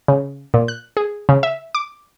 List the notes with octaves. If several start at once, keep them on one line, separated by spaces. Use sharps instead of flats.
C#3
A#2
F#6
G#4
C#3
E5
D6